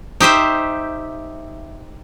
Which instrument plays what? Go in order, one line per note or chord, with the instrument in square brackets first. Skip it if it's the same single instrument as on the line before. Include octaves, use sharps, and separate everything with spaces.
[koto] D#4 G4 C5 E5